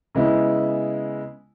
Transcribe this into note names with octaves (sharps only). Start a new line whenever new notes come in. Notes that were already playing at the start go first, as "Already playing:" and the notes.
C#3 G#3 B3 E4